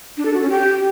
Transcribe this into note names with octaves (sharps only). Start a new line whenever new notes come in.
D4
A4
F#4
C#4
G4